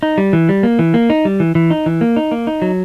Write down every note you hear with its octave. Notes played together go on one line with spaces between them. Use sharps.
D#4
G3
E3
G3
A#3
E3
A#3
D#4
G3
E3
E3
D#4
E3
A#3
D#4
A#3
D#4
F#3